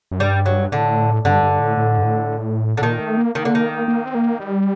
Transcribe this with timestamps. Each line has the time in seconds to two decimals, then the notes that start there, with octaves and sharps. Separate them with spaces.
0.11 F#2
0.20 G2 G3
0.46 F#3
0.72 A2 D3
1.25 G2 D3
1.43 G2
1.60 A2
1.77 A2
1.98 G2
2.04 A2
2.77 D3
2.82 A#2 D#3
3.00 A3
3.17 A#3
3.35 D#3 A#3
3.45 D3
3.55 D#3
3.88 A#3
4.06 C4
4.15 A#3
4.40 G3